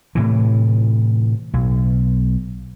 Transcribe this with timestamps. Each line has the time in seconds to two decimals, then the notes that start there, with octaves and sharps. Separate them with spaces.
0.15 A2 C3 E3
1.53 B1